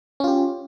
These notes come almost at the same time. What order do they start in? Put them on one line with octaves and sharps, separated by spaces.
C#4 F4 G4